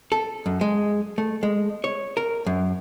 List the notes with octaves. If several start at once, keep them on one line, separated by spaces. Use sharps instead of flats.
A4
F#2
G#3
A3
G#3
C#5
A#4
F#2